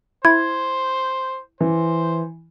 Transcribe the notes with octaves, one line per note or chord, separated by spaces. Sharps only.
E4 C5 G#6
E3 C5